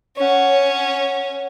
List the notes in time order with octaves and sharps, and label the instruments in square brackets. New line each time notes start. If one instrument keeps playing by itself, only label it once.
[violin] C#4 [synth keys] C#5 F#5